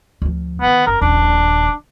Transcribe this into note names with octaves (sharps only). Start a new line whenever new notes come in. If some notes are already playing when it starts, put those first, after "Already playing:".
D2 F3
D3 D#3 B3
F#1 A#4
D#1 A#1 D4